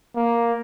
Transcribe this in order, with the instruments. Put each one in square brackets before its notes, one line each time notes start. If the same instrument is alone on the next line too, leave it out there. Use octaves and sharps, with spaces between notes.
[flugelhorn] A#3